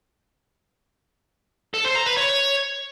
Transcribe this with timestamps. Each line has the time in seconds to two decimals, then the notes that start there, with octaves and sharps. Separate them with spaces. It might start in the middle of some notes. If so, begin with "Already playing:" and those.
1.74 A4
1.85 C5
1.95 A#5
2.06 B4
2.17 C#5